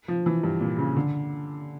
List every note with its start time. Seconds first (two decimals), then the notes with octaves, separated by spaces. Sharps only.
0.08 F3
0.26 E3
0.43 G2
0.61 A#2
0.78 C#3
0.96 D3